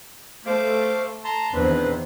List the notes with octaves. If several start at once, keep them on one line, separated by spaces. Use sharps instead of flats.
A3 C5 F5 D6
A5 A#5 C6
E2 D#3 C4 D4 B4 C5